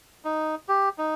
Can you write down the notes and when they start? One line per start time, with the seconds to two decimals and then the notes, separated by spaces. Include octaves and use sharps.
0.25 D#4
0.69 G4
0.98 D#4